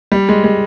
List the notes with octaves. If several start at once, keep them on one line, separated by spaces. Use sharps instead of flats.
G3
G#3
G#3